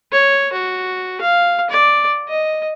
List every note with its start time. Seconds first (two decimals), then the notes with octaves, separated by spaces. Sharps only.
0.12 C#5
0.53 F#4
1.21 F5
1.70 D5
2.28 D#5